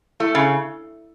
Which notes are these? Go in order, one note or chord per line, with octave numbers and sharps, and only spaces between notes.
A3 E4
C#3